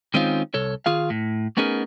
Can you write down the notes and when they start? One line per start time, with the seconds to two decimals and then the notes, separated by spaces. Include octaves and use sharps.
0.14 D#3 G#3 C4 C#4 D#4 F4
0.54 C2 A4 C#5
0.86 D#3 F4 G#4 F5
1.10 A2
1.57 A3 B3 C#4 D#4 G#4 A#4